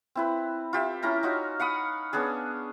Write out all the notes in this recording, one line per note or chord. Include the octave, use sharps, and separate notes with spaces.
C4 E4 B4
F4 G4 E5
C#4 E4 A#4 A#5
C#4 D#4 F4 F#4
F5 F#5 B5 D#6
B3 C#4 D4 G#4